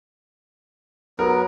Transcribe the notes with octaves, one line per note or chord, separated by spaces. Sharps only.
F#3 B3 A#4